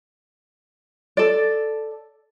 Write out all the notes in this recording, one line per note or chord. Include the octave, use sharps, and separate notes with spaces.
A4 D5